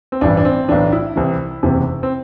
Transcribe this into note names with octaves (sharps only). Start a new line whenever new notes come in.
C4
A1 G2 E3 D4
D4
C4
B1 A2 E3 D4
E4
C2 C3 E3
F#1 E2 C3 E3
C4